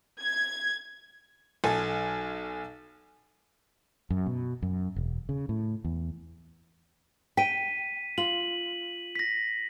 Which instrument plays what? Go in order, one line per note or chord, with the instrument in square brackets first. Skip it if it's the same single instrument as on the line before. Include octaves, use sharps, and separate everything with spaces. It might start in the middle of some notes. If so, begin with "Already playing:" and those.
[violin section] G#6
[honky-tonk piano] B1 A4 G#5
[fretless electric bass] F#2
B2
F#2
E1
C#3
A2
E2
[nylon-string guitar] G5 [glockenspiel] B6 D#7
[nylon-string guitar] F4 [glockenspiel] F#7
[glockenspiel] A#6 B6